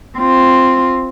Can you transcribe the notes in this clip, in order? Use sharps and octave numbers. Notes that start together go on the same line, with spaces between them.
C4 F4